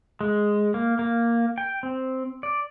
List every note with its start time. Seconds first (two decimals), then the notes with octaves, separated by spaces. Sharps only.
0.21 G#3
0.74 A#3
0.99 A#3
1.58 G5
1.83 C4
2.43 D5